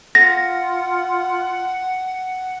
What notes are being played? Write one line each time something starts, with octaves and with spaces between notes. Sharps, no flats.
F4 F#5 A#6